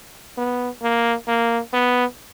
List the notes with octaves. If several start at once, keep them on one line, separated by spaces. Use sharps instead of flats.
B3
A#3
A#3
B3